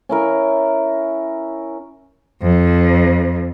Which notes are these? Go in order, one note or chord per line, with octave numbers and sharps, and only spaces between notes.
C#4 E4 A#4
F2